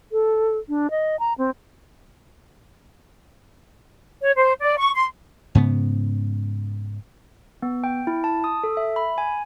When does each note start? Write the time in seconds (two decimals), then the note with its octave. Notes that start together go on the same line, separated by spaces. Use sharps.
0.12 A4
0.69 D4
0.90 D#5
1.19 A#5
1.38 C4
4.21 C#5
4.36 C5
4.61 D5
4.77 C#6
4.94 C6
5.55 G#2 C#3 B3
7.62 B3
7.84 G5
8.07 E4
8.24 A5
8.44 D#6
8.64 A4
8.77 E5
8.96 B5
9.18 G#5